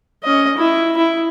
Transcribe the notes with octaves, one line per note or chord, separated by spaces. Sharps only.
C#4 D#5
E4
E4